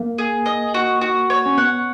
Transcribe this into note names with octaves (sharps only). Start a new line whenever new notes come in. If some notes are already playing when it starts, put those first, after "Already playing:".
Already playing: A#3
G#4
D#5
F#4
F#4
C#5
C#4
B3 F#5